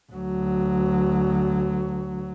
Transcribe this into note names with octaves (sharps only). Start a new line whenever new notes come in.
D2 F#3